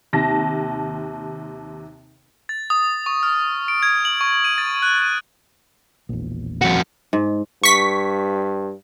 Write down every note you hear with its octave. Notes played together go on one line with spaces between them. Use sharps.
D#2 C3 A5 A#6
A6
D#6
C#6
F6
D7
G#6
F#7
C#6
D#7
A6
F#6
D#7
E1 A#1
F2 F#4
G#2
G2 C#6 B6